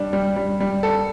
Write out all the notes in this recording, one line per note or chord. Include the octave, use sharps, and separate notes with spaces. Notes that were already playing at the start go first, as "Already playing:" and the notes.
Already playing: G3 D4
G3
G3
G3
A4